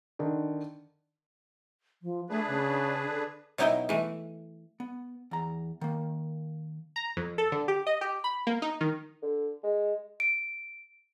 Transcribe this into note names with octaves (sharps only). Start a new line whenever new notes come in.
D3 D#3
F3
A3 D4 G#4 B4
C#3
D3
B2 F#3 D#4 E4 E5 G5
E3 A3
B3
E2 A#5
D#3 A#3
A#5
F2
A4
D3
G4
D#5
G4
B5
A#3
D#4
D#3
D3
G#3
D7